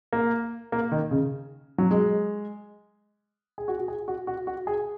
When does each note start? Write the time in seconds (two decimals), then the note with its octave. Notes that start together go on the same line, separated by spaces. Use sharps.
0.13 A#3
0.72 A#3
0.92 D#3
1.11 C#3
1.78 F#3
1.91 G#3
3.58 G#4
3.68 F#4
3.79 F#4
3.88 G#4
4.08 F#4
4.27 F#4
4.47 F#4
4.67 G#4